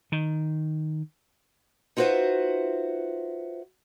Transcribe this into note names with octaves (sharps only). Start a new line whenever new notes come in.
D#3
D#4 F4 F#4 B4 C5 E5